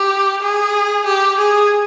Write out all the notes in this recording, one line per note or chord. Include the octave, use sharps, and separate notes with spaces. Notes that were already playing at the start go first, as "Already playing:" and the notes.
Already playing: G4
G#4
G4
G#4